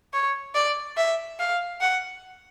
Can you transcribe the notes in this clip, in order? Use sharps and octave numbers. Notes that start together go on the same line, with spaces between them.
C#5
D5
E5
F5
F#5